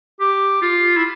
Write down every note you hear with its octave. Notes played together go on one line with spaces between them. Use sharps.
G4
F4
E4